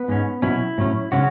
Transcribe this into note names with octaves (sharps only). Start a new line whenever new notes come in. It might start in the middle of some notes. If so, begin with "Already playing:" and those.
Already playing: B3 B4
G#2 G#3 C#4
B2 F#3 C#4 E4
A2 F#3 C#4
C#3 F#3 G#3 C#4 F#4